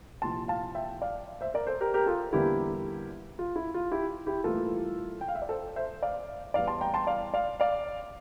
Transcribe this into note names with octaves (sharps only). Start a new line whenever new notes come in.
C2 A#2 F3 A5 C6
F5 A5
E5 G5
D5 F5
C5 E5
A#4 D5
A4 C5
G4 A#4
G4 A#4
F4 A4
E2 D3 G3 A#3 E4 G4
F4
E4
F4
E4 G4
E4 G4
A2 E3 G3 A#3 F4 A4
G5
F5
E5
D5
A4 C5
C5 E5
D5 F5
E2 E3 G3 D5 F5
A5 C6
G5 A#5
A5 C6
D5 F5
D5 F5
D5 F5